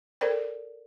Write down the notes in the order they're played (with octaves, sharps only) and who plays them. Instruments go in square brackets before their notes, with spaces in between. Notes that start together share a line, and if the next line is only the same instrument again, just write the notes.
[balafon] A4 A#4 C5 D5 G5